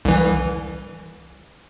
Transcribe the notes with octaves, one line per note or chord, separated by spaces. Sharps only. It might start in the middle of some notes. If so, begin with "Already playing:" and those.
C2 E3